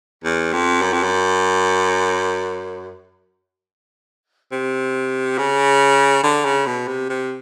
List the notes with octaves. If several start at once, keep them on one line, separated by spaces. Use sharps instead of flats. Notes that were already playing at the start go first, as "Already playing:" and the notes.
E2
F2
F#2
F2
F#2
C3
C#3
D3
C#3
B2
C3
C3